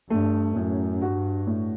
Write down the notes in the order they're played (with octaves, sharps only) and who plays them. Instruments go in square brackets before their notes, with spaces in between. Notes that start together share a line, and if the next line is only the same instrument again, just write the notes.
[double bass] G2 [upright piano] A3
[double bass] F#2 [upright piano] A2
[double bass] G2 [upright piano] F#4
[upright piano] A2